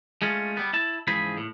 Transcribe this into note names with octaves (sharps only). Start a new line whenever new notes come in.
G#3 A3 C#4 F4
G3 B3
E4 A5
C#2 G#2 E3 F3 G#4 B5
A2